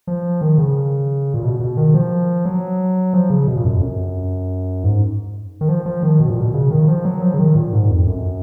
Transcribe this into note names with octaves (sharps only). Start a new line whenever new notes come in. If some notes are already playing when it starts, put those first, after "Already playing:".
F3
D#3
C#3
A#2
B2
B2
D#3
F3
F#3
F3
C#3
B2
A#2
F#2
F2
F#2
G#2
D#3
F3
F3
D#3
B2
A#2
B2
C#3
D#3
F3
F#3
F3
C#3
D#3
A#2
G#2
F2
F#2